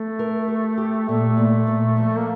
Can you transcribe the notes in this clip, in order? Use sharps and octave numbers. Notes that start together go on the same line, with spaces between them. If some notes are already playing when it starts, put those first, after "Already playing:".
Already playing: A3
A#4
G4
G4
A#2 A3
A#2
A#2
F3
A#3